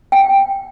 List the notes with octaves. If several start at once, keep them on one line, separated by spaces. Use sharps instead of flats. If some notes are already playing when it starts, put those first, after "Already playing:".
G5